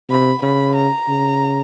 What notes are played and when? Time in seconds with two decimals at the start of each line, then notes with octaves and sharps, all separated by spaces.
0.09 C3 B5
0.42 C#3 B5
0.76 A#5
1.08 C#3